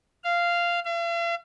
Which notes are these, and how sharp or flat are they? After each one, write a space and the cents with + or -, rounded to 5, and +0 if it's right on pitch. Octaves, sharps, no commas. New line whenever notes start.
F5 -10
F5 -45